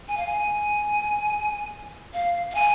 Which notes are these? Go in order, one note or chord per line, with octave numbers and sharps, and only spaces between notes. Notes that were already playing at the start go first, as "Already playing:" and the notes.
G#5
F5
G#5
F5
F5
G#5